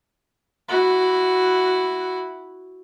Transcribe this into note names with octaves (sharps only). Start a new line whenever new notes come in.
E4 F#4